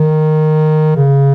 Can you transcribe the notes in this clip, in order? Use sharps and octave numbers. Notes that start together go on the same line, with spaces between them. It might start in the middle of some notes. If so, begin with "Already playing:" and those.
Already playing: D#3
C#3